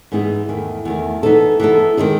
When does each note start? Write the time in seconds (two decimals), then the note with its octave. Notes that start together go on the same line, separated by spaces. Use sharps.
0.12 G#2 E3 B3 D#4 G#4
0.49 E2 D#3 A3
0.85 E2 D#3 A3
1.23 E3 B3 D#4 A4
1.60 E3 B3 D#4 A4
1.97 D#3 G#3 D#4 G#4